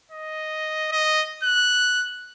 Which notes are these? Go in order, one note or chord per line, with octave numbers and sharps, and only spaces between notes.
D#5
D#5
F#6